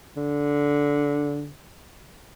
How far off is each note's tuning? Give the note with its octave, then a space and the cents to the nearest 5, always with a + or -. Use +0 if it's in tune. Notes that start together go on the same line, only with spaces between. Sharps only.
D3 -15